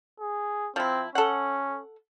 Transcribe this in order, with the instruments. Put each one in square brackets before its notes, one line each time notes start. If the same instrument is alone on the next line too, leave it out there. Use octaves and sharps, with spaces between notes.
[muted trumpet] G#4
[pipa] F3 E4 [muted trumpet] C4
[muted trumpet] C#4 [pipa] A4 F#5